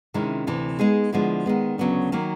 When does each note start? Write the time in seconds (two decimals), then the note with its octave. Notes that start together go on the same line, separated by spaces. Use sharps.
0.14 C3 D#3 G#3 C#4 E4
0.47 D2 C3 E3
0.79 G#3 B3 D#4 G#4
1.13 D3 F3 G#3 B3 E4
1.46 D#3 G#3 B3
1.78 D2 C#3 F#3 B3 D4
2.12 D#3 F#3 A#3